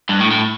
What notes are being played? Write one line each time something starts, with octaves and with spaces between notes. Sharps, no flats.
G2
A2
A2